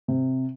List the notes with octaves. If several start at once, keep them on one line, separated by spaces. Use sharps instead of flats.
C3